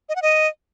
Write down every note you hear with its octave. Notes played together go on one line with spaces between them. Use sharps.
D#5
F#5
D#5